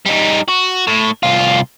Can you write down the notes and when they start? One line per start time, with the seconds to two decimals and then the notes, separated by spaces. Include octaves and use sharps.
0.06 G3 D#4
0.48 F#4
0.87 A2
1.23 C2 F4